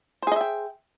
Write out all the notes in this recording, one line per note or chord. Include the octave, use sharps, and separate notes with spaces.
G#4 C5 D#5 E5 G5